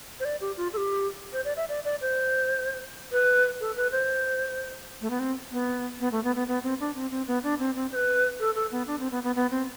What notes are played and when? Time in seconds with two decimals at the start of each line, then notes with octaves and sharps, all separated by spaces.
0.20 C5
0.25 D5
0.41 G4
0.57 F4
0.73 A4
0.77 G4
1.33 C5
1.45 D5
1.57 E5
1.69 D5
1.85 D5
2.01 C5
3.12 B4
3.60 A4
3.76 B4
3.92 C5
5.01 A3
5.10 B3
5.19 C4
5.52 B3
6.00 B3
6.12 A3
6.24 B3
6.36 B3
6.48 B3
6.63 C4
6.80 D4
6.95 C4
7.11 C4
7.27 B3
7.43 D4
7.59 C4
7.75 C4
7.92 C5
7.95 B4
8.39 A4
8.55 A4
8.71 B3
8.87 D4
8.99 C4
9.12 B3
9.24 B3
9.36 B3
9.51 C4